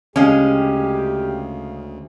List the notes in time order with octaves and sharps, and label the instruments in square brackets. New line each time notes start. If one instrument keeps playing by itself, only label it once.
[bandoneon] D2 [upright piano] C#3 F5 [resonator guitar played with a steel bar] G#3 C#4 [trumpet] G4